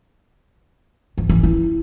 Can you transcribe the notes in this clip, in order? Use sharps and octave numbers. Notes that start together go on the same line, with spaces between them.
E3
E3
E4